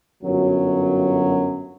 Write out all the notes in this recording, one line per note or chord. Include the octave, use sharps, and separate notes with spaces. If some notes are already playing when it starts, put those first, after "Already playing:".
G1 F#2 F#3